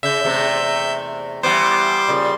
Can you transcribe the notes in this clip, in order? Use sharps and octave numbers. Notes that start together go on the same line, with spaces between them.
C#3 E5 G6
E2 C3 A3
E3 G3 B3 C5 C6 D6
A#2 C#3